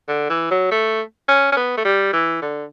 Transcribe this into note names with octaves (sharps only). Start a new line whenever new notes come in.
D3
E3
F#3
A3
C#4
C#4
B3
A3
G3
E3
D3